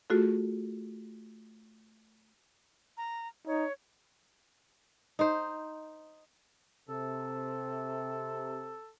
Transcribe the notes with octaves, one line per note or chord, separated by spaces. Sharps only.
A3 F4 F#4 G#4 A4
A#5
D#4 C#5
D#4 C5
C3 A4